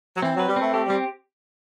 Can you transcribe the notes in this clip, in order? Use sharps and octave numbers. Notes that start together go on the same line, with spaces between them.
F#3
E3 C4
F#3 B4
G3
A3 C4
A3 G4
G3 C4